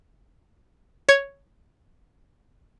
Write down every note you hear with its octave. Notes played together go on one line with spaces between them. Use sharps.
C#5 G#6